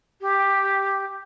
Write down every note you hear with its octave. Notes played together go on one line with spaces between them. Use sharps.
G4